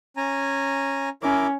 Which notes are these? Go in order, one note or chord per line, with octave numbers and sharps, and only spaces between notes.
C#4 G#5 A#5
C#4 E4 A#4 D6